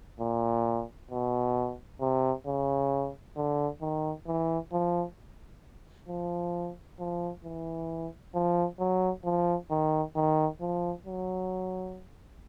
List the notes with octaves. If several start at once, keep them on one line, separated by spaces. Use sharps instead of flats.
A#2
B2
C3
C#3
D3
D#3
E3
F3
F3
F3
E3
F3
F#3
F3
D#3
D#3
F3
F#3